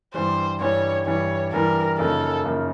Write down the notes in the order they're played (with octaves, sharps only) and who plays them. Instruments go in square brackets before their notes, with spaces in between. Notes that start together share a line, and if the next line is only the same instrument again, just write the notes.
[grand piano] G2 E3 G3 [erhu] C5
[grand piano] G2 E3 G3 [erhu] C#5
[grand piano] G2 E3 G3 [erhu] C#5
[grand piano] G2 E3 G3 [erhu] A#4
[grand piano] F#2 C#3 F3 A#3 D#4 [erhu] A4
[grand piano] F#2 C#3 F3 A#3 D#4